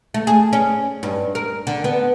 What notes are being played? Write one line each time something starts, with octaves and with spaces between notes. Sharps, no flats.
A3
G#4
C#4
G2
A#4
D3
B3